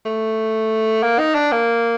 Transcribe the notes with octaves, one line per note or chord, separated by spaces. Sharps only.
A3
A#3
D#4
D4
A#3